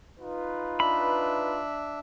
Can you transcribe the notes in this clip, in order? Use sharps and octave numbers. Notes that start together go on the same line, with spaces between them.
D#4 F4 B4
D4 E5 B5